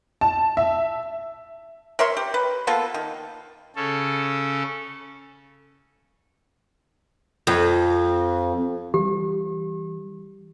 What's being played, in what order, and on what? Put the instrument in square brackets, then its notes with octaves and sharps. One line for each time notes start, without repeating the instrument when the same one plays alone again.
[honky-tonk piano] A5
E5
[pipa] A#4 C#5 E5 C6
G4
B4
A#3 B3 F4 A4
D#3
[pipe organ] C#3 C#4 A4
[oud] F2
[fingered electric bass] E3 G3 [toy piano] G4